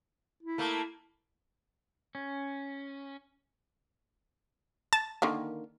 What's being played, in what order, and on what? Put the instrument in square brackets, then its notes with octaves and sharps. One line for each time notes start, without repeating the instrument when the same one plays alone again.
[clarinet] E4
[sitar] A3 A#3
[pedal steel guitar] C#4
[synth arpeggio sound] A5
[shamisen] D3 D#3 A#3